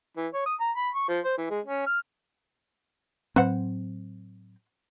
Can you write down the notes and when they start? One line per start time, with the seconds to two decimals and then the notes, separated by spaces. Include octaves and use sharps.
0.17 E3
0.34 C#5
0.46 D#6
0.60 A#5
0.77 B5
0.94 C#6
1.09 F3
1.24 C5
1.38 E3
1.50 G#3
1.66 C#4
1.86 F6
3.36 A2 F#3 C4 B4 C5 F#5